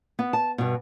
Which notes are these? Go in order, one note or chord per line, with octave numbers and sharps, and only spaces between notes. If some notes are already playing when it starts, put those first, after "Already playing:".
B3
A5
G2 B2